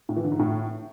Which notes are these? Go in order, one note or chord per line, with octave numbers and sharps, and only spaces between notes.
A2
E3
D3
G#2
A2